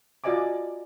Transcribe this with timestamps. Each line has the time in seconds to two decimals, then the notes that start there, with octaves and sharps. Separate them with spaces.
0.24 F4 F#4 D5 D#5 G#5 D6